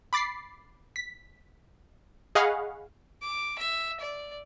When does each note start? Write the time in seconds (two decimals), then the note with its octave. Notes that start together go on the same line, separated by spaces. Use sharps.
0.13 B5 D6 A6 B6 C7
0.96 B6
2.35 G#4 D#5 F5 F#5 B5 C#6
3.22 D6
3.59 E5
4.01 D5